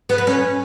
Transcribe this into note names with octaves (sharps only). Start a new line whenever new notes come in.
B3
B4
C#4